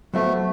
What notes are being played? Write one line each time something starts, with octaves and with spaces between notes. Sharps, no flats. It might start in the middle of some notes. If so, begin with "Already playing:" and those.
F#3 A3 B3 F#4 C5 E5